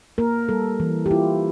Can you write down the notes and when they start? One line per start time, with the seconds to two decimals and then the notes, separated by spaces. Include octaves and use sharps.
0.18 A#3 A#4
0.49 G3 A4
0.80 E3
1.06 G4
1.11 E4 F4